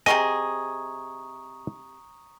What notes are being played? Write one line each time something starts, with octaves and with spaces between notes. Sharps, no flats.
C3 F#3 G#4 D#5 A#5 C#6 D#6